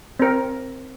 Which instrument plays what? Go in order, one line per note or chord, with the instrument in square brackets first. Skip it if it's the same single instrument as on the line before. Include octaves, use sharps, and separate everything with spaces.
[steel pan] C4 A#4